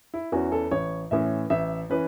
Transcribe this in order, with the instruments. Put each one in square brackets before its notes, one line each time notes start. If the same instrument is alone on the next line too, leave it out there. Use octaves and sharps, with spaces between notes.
[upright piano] E4
E2 E3 C#4 F#4
A4
A1 C#5
A2 E3 C#4 E5
A1 E5
E3 C#4 B4